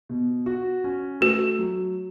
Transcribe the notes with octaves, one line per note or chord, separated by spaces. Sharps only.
B2
F#4
C#4
A3 F#4
F#3